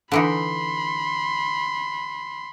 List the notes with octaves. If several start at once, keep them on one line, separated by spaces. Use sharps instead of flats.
D3 E3 D#4 B5 C6